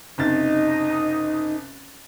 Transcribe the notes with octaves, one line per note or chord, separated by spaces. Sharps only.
F#1 C3 D#4 A6